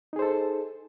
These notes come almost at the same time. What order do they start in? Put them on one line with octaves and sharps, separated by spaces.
D#4 G#4 C5 A4